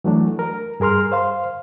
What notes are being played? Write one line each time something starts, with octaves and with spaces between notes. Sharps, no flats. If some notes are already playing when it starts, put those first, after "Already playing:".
E3 F#3 A3 D4
A#4
G2 G#4 A#4 C6 F6
C5 F5 C6